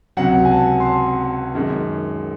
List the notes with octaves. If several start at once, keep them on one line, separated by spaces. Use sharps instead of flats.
C#2 C3 F#3 F#5
G#5
A5
C6
A5
F#2 D#3 G#3